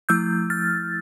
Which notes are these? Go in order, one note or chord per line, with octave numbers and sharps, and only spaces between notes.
F3 A3 E4 E6 G6
F6 A6